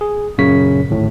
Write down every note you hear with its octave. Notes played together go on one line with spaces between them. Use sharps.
G#4
F#2 A#2 C#3 C#5 B6
G#1 D2 A2